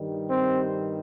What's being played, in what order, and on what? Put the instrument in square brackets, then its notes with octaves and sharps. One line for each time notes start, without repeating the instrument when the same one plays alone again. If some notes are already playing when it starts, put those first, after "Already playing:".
Already playing: [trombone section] G2 D#3 G3
C4